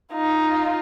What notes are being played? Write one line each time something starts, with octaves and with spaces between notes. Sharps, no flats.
D#4 F4